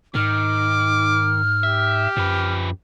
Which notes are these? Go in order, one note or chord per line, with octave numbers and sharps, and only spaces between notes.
G#2 D#3 D6 F6
G4 E5
F#2 F3 B4